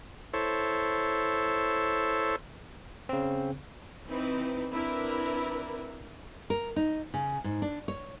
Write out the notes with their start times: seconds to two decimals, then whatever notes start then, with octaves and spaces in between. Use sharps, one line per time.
0.33 E4 A4 C5 C#5
3.09 C#3 C4
4.08 E3 C4 D#4 E4 B4
4.72 C4 D4 E4 A#4 B4
6.50 A#4
6.76 D#4
7.14 C#3
7.44 G#2
7.62 D4
7.88 C#5